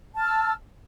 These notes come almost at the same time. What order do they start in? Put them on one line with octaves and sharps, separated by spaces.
A5 F6 E6